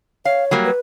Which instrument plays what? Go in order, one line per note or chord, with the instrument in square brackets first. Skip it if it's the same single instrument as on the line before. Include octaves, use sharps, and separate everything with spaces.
[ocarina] C#5 [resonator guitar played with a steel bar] F5
[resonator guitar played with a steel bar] F#3 G3 A#3
[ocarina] B4